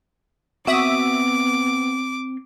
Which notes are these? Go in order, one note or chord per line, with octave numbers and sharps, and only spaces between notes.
B3 C4 F#4 E5 D6 D#6